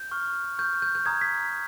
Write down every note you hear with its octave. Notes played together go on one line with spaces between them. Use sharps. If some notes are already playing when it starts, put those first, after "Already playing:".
Already playing: G6
C#6 F6
C#6 F6 G6
G6
G6
A#5 D#6 G6 G#6
B6